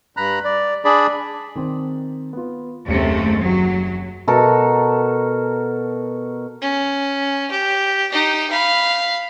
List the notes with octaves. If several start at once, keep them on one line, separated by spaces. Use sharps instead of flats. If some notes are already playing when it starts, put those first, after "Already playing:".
G2 A#5 B5 F#6
D5
D4 G#4 D5 B5
D#3 C4
B3 F4
F#1 D#2 C3 A3 C#7
F#3
B2 F#4 A4 A#4
C#4
G4
D#4 G4
F5 B5